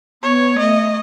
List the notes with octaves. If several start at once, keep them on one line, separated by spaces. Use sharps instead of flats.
B3 C#5
A3 D#5